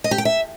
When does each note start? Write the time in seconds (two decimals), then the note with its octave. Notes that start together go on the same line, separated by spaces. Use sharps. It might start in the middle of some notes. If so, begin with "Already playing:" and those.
0.04 D#5
0.11 G4
0.18 G5
0.25 E5